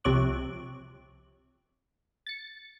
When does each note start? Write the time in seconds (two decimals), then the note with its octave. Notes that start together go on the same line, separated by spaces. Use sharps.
0.04 C2 C3 F3 C#5 D6 F#6
2.26 A6 C#7